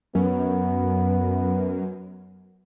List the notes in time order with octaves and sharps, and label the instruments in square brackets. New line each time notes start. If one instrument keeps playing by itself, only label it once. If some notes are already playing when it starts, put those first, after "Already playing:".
[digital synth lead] F#2 [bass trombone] B3